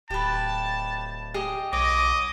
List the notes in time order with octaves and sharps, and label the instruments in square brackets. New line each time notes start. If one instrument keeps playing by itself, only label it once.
[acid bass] D1 [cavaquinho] G4 B4 [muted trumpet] A5
[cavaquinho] G4 G#4 D#5
[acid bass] B1 [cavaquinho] C#5 [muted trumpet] D#5 [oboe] D6